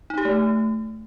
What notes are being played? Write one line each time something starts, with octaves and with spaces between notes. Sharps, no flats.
D#4
G4
A3